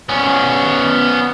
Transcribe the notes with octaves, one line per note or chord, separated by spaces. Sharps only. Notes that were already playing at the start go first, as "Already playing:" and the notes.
B3 C#4